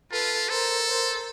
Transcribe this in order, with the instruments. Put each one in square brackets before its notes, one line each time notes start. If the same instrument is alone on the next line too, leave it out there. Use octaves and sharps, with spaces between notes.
[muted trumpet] F4 [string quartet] A4 B4
[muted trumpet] A4 [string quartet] A#4 C5
[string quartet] A#4 C5